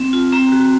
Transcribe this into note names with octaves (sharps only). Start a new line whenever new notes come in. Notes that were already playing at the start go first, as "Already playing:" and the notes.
Already playing: C4
F4
C4 A#5
F#4